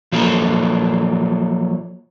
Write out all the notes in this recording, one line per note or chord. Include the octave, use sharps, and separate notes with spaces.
F3 F#3 A#3 A4